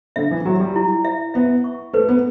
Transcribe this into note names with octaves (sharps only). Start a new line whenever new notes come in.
D3 E5
E3
F#3 G4
G3
E4
E5
B3 E5
C#6
A3 B4
B3